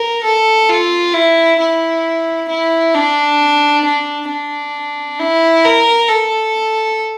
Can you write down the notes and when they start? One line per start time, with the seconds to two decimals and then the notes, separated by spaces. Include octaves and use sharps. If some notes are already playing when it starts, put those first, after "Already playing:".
Already playing: A#4
0.23 A4
0.69 F4
1.13 E4
1.60 E4
2.49 E4
2.95 D4
3.85 D4
4.29 D4
5.20 E4
5.64 A#4
6.09 A4